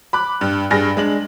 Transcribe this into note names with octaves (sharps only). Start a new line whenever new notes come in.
B5 D6 F#6
G2
G2 G#4 A#6
G#3 D4 F#7